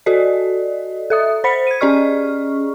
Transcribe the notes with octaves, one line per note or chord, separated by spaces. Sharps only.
F#4 A4 D5 D#5
A4 E5 D#6
C5 B5 B6 C#7
G#6 D#7
C#4 G#4 D5 D#5 C#6 F6